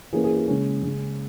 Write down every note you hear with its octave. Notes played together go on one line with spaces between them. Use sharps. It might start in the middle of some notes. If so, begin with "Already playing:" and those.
E3 A#3 C#4 G#4
G#4
G#4
C#3 G#3 C#4
C#3 G#3 C#4